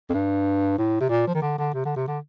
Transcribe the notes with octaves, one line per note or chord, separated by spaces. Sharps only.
F2
G2
A2
C3
A#2
F3
D#3
D3
D3
C3
D3
C3
D3